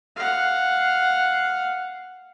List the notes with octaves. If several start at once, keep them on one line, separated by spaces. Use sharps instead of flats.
F5 F#5